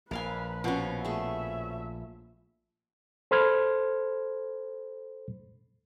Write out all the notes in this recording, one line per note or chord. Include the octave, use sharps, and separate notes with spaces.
A#1 A#4 B4 F5 G#5
B2 F3 B3 C#4 F#4
A3 G#4 E5
A4 C5 B5 C6 F6 G#6